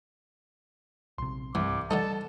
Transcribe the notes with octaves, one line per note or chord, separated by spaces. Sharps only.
A#1 C3 C6
C2 G2 E3 D6
D3 E3 G3 D#4 A4 A5